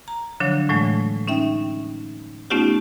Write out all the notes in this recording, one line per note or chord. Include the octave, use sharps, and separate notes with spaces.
A#5
D3 F3 F#3 D4 C#5
A2 E3 F#3 G#3 A3
C#4 D#4 E5 G5
A3 B3 C#4 D#4 F4 G4